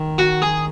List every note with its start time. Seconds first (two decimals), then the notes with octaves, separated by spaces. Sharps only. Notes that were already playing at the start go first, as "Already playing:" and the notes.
Already playing: D#3
0.18 F#4
0.42 G#4